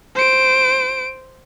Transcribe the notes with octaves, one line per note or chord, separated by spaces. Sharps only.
C5 D7